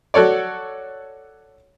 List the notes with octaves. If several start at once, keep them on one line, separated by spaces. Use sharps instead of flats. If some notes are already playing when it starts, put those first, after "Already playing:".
F#4 A4 C#5 D5